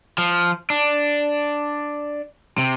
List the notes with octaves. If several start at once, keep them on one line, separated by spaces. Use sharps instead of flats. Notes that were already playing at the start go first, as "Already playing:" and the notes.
F3
D4
C3